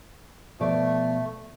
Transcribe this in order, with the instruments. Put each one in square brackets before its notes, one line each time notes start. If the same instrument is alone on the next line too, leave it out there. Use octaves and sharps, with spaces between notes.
[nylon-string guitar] B2 F3 D5 [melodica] A3